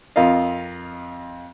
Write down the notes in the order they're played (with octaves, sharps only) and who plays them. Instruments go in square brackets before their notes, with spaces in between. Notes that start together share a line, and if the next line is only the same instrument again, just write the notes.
[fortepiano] F2 F4 A#4 D#5 F5